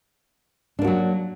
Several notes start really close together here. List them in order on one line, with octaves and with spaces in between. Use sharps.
D4 A#3 F#4 F#3